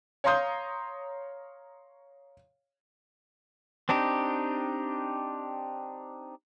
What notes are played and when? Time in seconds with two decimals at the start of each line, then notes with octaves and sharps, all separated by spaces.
0.24 C#5 F5 A#5 C6 D#6 G6
3.89 C4 D4 D#4 G4